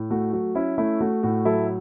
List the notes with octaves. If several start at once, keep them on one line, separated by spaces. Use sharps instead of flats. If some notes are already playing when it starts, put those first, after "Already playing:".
Already playing: A2
A3 F#4
F#3 F#4
C#4 E4
A3 E4
A3 F#4
A2 F#4
F#3 E4 A4